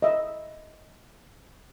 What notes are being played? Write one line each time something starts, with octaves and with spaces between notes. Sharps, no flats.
D#5 E5